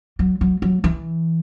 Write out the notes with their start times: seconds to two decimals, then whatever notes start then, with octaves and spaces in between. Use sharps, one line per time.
0.19 F#3
0.41 F#3
0.62 F#3
0.84 E3